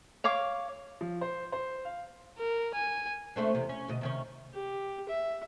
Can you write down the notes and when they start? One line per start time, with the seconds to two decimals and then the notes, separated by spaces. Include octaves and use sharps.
0.24 C#5 F5 D6
1.01 F3
1.21 C5
1.52 C5
1.85 F5
2.38 A#4
2.75 G#5
3.36 A3 C4 D4
3.55 E2 C3
3.69 C#4
3.88 D2 B2 D#5
4.01 C3 D#3 C#4
4.54 G4
5.09 E5